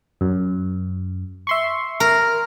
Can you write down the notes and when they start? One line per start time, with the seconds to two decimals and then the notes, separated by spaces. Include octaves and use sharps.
0.21 F#2
1.47 E5 C6 C#6
2.00 A#4